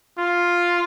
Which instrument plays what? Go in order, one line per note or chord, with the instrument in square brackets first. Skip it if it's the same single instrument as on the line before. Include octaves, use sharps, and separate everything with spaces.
[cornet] F4